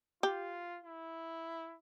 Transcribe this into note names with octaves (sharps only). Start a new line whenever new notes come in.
F4 G4
E4